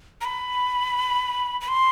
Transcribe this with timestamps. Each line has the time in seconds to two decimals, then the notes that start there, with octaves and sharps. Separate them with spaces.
0.21 A#5
0.25 B5
1.61 B5
1.68 C6